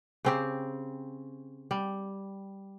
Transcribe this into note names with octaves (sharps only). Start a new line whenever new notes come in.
C#3 C4 G4
G3